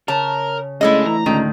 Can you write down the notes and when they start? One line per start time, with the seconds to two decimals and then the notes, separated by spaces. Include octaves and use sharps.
0.08 C#3 A#4 A5
0.81 C#3 G#3 A3 D4 E4 A4 D#5
1.06 E3 A#5
1.26 C#2 A2 D3 D#3